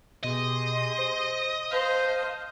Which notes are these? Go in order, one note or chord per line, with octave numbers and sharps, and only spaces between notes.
B2 G4 G#4 D#5 C6
C5
C5 F5 A5 F6 G6